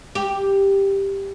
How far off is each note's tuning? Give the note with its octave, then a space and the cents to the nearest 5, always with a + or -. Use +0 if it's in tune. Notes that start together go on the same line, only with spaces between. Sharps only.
G4 +5